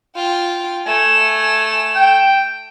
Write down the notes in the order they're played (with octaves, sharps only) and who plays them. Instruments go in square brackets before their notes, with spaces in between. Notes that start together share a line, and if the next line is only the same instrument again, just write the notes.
[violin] F4 G5
[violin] A3 E7 [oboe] G#5
[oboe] G5